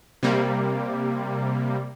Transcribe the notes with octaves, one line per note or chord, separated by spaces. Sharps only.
C3 G3 A#3